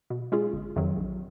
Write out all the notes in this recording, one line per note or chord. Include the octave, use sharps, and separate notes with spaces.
B2
G#3 C#4 F4 G#4
G1
F2 C3 D#3 F#3
A#1